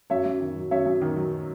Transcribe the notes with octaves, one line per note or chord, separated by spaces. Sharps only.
F#2 C#5 E5
F#2
D#3
F#3
F#2 C#5 E5
F#2
D#3
F#3